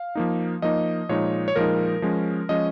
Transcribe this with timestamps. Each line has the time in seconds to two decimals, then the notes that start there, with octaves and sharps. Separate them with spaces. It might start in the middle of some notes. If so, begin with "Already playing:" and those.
Already playing: F5
0.15 F3 A#3 D#4
0.62 F3 A#3 D#4 D#5
1.09 A#2 F3 G#3 D#4 C#5
1.48 C#5
1.56 A#2 F3 G#3 D#4 A#4
2.02 F3 G#3 C#4
2.49 F3 G#3 C#4 D#5